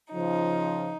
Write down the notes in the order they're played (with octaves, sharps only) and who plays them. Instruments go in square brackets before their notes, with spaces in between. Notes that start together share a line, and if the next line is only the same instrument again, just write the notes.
[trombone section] C#3 F3 [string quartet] D#4